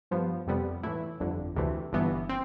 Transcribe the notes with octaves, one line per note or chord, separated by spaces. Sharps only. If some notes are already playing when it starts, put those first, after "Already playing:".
G2 F3 B3
F2 C3 G3 B3
A2 E3 A3 E4
G1 F2 D3
D2 C3 E3 A3
G1 G2 E3 B3
C4